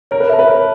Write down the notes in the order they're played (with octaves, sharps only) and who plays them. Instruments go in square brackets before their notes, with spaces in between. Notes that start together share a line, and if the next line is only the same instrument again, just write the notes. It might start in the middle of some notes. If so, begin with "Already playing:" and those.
[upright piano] A#4 [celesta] C#5
[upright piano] B4
[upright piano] A#4 [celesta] E5 A5
[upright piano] B4
[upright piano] A#4 [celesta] C#5